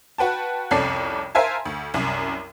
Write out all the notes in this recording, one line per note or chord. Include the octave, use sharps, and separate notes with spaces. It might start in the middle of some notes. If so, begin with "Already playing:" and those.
F#4 B4 G5 A5
C2 F2 C#4 A4 D5 C7
A#4 C5 E5 F5 G#5 A5
D2
C2 F#2